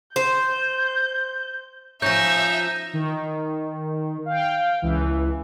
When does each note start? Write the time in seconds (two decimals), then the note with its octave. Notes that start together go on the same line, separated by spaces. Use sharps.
0.16 C5 G6
2.02 F3 C#4 D#4 E5 G6 A#6
2.94 D#3
4.26 F5 G5
4.82 C#2 E3